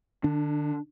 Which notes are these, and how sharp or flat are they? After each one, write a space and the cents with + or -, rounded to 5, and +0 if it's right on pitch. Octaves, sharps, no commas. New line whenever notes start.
D3 +35 D4 +0